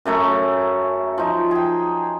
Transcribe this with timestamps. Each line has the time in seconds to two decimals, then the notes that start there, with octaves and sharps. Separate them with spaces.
0.05 F#2 C#3 A3 A#5
1.18 F3 D#4
1.51 G#4 G5